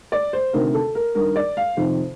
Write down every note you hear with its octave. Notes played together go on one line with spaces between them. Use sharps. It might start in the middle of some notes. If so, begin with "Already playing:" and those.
D5
C5
D2 C3 D#3 A#4
A4
A#4
G2 D#3 A#4
D5
F5
F2 C3 D#3 C5